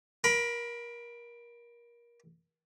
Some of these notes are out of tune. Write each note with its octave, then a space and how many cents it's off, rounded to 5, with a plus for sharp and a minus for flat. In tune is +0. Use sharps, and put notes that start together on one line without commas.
A#4 +25 B5 +0